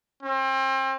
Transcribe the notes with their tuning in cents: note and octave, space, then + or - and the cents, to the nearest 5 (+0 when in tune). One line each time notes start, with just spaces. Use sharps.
C4 +35